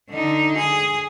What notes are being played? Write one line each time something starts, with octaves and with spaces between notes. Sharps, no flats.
D3 D#4
G#4